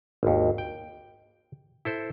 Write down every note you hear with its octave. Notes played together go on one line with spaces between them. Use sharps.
G#1 D#2
G5
E4 A4 C5